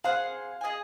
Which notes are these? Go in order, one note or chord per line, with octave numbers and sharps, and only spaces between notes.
G#4 C5 F5 F#5
G#4 D#5 G#5